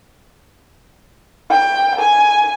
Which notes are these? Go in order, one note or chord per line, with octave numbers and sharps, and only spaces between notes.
G5
G#5